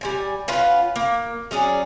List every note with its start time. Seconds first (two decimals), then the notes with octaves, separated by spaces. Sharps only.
0.01 G3 C4 G#5
0.48 C#4 F4 B4 F#5
0.96 A#3
1.51 F#3 C#4 G#4 D5